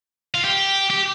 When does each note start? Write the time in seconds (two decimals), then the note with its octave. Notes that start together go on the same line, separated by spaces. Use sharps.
0.34 F4
0.44 G4
0.90 G4